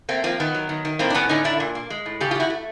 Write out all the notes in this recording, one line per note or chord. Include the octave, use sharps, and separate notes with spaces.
A3 A#3 C4
F3 A#3 C4
D#3 B3
F#3
D#3
D#3
A2 A#3 C4
D4
A2 B3 C#4
D3 C#4 D#4
D3 D4 E4
A#2
A#3
G#3
A2
C#3 G4 A4
F4 G4
F#3
E4 F#4
A3